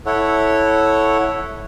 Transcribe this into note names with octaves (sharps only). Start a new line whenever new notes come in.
E4 A4 C#5 F#5